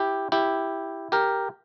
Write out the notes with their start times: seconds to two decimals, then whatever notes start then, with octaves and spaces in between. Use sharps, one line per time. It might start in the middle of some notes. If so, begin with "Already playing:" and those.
Already playing: E4 G4
0.32 E4 G4
1.12 G4 A#4